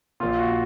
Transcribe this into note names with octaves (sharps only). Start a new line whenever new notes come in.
A#1 A#2 F4
F#4